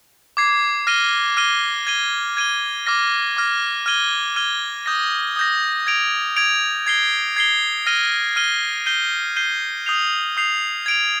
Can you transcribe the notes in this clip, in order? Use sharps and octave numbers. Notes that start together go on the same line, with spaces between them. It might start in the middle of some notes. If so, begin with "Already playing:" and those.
D6 G#6 C7
F6 A#6 D#7 G7
F6 A#6 D#7 G7
G#6 D#7 G7
G#6 D#7 G7
D6 F6 A#6
D6 F6 A#6
F6 G#6 D#7 G7
F6 G#6 D#7 G7
D#6 G6 A#6
D#6 G6 A#6
G#6 D7 F7
G#6 D7 F7
G#6 C7 G7
G#6 C7 G7
F6 A#6 D#7 G7
F6 A#6 D#7 G7
G6 C7 D#7 G7
G6 C7 D#7 G7
D#6 G6 C7 F7
D#6 G6 C7 F7
G#6 D7 F7